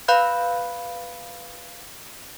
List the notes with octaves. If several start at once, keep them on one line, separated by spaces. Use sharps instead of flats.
B4 F5 B5 F#6 G6